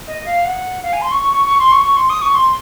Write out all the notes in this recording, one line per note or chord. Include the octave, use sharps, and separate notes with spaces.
D#5
F5
F#5
F5
G#5
C6
C#6
C#6
C#6
C#6
C6
C#6
C#6
C6
D#6
C#6
C6